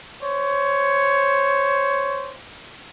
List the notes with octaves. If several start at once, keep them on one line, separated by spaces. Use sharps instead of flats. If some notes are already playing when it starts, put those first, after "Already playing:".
C5 C#5